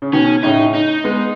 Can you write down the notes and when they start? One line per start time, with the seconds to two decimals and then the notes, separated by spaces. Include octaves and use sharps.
0.02 C#3
0.13 B2 D#3 C#4
0.43 A2 C#3 D#4
0.75 D#4
1.04 G#3 B3